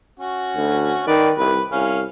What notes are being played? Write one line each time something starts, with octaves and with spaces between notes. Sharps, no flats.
C#4 F#4
D2
D#3 B4 D5
C2 B4
C2 C#4 F5